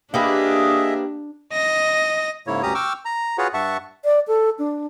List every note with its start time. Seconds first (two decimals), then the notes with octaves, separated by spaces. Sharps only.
0.14 A#3 D4 G4 G#4 B4 D#5 E5
1.52 D#5 A#6
2.47 G#2 C#3 A#3 E4 C#5
2.63 D2 G2 C#4 G4 A#5 D#6
2.75 G5 C#6 D6 E6 F6
3.05 A#5
3.38 F4 F#4 G#4 B4 C#5 F#5
3.54 G2 E5 F#5 A5 C#6
4.05 D5
4.28 A4
4.59 D4